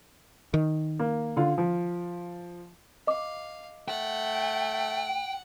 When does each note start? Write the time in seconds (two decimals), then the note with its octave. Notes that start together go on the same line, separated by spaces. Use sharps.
0.54 D#3
0.99 A#3
1.37 D3 F4
1.58 F3
3.07 D#5 F5 D6
3.88 A3 F#5 G5